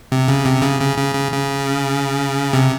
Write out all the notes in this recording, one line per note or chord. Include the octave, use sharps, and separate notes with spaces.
C3
C#3
C3
C#3
C#3
C#3
C#3
C#3
C3